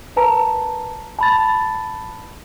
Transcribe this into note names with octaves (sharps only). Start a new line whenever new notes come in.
A#4 B4 A5 A#5
A5 B5 A6